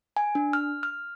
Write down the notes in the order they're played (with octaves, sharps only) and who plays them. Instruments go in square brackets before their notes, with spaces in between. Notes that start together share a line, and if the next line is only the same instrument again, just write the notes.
[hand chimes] G#5
D4
F6
F6